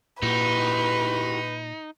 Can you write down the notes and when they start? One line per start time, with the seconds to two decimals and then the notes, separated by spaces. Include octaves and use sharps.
0.22 A#2 D#4 E4 F#4 G4 B4